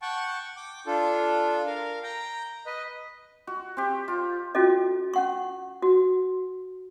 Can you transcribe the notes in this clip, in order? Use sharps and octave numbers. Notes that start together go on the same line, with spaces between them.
F#5 G5 A5 C#6
G5 D6
D4 F4 A4
A#4 F5
G5 A#5
B4 D#5
F#4
C4 G4
F4
C#4 F4 F#4 A4 D#5
C#4 F#5 C#6
F#4